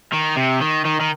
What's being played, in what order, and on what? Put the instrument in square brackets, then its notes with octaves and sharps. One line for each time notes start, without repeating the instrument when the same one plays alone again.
[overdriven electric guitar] D#3
C3
D#3
D#3
D#3